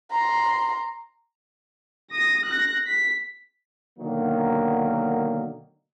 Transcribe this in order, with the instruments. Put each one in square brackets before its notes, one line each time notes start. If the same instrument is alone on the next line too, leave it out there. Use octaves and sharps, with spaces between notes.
[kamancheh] A#5 C6
[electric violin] D#6 A#6
F#6 A#6
B6
[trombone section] B2 D3 D#3 F#3 A#3